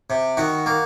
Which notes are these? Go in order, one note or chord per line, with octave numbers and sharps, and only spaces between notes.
C3
D#3 F#4
A#3